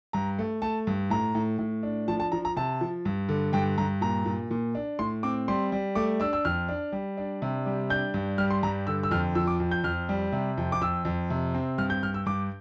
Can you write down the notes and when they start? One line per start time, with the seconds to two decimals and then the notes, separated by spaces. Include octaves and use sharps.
0.13 G2 A#5
0.39 A3
0.62 A3 A5
0.87 G2
1.10 A2 A#5
1.35 A2
1.59 A2
1.83 D4
2.08 F3 A5
2.20 A5
2.32 F3 A#5
2.45 A#5
2.56 C3 A5
2.81 F3
3.05 G2
3.29 D3
3.53 G2 G5
3.78 G2 A#5
4.01 A#2 A#5
4.26 A#2
4.51 A#2
4.75 D4
4.99 A2 C6
5.23 C4 D6
5.48 G3 C6
5.72 G3
5.95 A3 D6
6.20 D4 E6
6.33 E6
6.45 F2 F6
6.69 D4
6.92 G3
7.17 D4
7.42 C3
7.66 G3
7.90 D4 G6
8.14 G2
8.38 G3 F6
8.51 C6
8.63 G2 A#5
8.87 D3 E6
9.03 E6
9.11 F2 F6
9.35 F3 E6
9.47 D6
9.60 F2
9.71 G6
9.84 F2 F6
10.09 G3
10.32 C3
10.58 F2
10.72 D6
10.81 F2 E6
11.05 F2
11.30 C3
11.55 C4
11.78 G2 F6
11.90 G6
12.03 G2 F6
12.14 E6
12.26 G2 D6